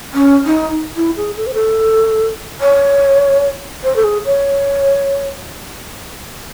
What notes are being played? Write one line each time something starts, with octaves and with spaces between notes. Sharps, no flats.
C#4
D#4
E4
G#4
A4
C5
A4
C#5
C5
A4
G#4
C#5